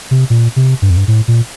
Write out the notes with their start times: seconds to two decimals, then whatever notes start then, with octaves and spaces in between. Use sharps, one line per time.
0.11 C3
0.30 A#2
0.56 C3
0.82 G2
0.90 F2
0.97 G2
1.08 A2
1.28 A#2